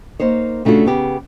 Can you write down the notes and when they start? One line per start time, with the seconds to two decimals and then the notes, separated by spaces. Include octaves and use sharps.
0.20 A#3 D#4 C5 C#5
0.65 C#3 A3 D4 F4 F#4
0.85 C#3 B3 G4